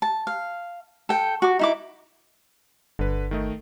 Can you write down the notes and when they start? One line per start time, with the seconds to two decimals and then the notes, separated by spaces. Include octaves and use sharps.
0.02 A5
0.27 F5
1.09 A4 G5
1.42 F#4 D6
1.59 D#4 E4 D6
2.99 G1 D3 B4
3.31 D#3 A3 D#5